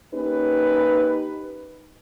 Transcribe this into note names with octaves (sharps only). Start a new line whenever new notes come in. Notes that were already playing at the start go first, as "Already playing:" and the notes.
A#3 C#4 D#4 G4 B4